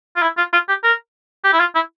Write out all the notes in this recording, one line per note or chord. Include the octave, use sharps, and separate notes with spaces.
F4
E4
F4
F4
G4
A#4
G4
E4
F4
E4